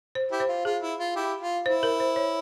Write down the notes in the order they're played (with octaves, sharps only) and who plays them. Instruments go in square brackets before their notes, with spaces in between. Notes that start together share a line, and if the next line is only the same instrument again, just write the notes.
[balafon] C5
[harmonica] E4 G4
[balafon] C5
[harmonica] F4
[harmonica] F4 [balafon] G#4
[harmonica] E4
F4
E4 G4
F4
[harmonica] E4 [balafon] C5
[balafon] A#4
C5
C#5